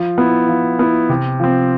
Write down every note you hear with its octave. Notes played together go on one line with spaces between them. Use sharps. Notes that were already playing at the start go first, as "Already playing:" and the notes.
Already playing: F3
B3 E4
F3
B3 E4
C3
F3 C4